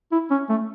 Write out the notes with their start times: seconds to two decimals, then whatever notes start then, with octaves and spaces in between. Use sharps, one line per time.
0.12 E4
0.31 C#4
0.49 A3